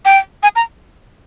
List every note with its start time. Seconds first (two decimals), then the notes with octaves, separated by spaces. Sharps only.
0.05 G5
0.43 G#5
0.56 A#5